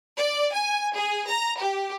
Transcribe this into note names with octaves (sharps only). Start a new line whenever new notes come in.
D5
G#5
G#4
A#5
G4